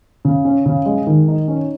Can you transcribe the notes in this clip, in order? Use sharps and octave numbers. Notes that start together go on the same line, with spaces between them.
C#3
C#4
C#3
G#3
D#3
D#4
C#4